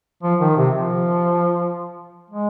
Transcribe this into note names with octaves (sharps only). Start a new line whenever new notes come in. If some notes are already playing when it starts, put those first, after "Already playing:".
F3
D#3
C3
F3
G#3